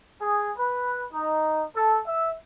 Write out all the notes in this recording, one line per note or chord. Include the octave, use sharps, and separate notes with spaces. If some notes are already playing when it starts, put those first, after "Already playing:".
G#4
B4
D#4
A4
E5